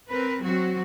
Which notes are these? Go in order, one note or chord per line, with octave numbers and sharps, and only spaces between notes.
C4 A#4 B4
F#3 C4 F#4